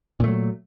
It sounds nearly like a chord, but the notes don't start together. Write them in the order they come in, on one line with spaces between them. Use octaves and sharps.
A#2 A3 F#3